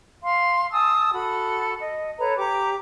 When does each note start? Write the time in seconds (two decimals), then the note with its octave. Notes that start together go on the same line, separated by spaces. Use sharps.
0.23 F5 C6
0.71 G#5 A5 D#6 E6
1.13 F#4 A4 B5
1.79 D#5
2.18 A4 B4 C#5 A#5
2.38 G4 A#5 D6